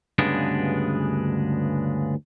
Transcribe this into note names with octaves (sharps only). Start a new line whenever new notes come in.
D2 G2 C#3 G#3 B3 D4